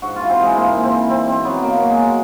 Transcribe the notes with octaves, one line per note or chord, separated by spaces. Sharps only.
G#2 F#4
F4
E3
C4
E3 G#3
G#2 A#3
G#2
C4
E3
B2 C4
B2 C4
F#3 B3
B2 A#3
F#3
G#3
B2